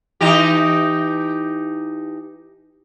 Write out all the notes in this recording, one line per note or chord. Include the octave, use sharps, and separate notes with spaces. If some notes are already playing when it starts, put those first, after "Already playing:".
E3 D#4 G4